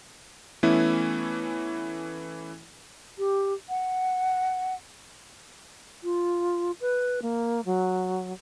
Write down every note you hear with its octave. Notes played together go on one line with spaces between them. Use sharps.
E3 A3 B3 C#4 E4
G4
F#5
F4
B4
A#3
F#3